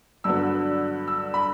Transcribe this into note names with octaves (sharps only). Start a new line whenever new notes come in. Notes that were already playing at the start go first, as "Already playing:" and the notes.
G2 D3 F#3 B3 E6
E6
B5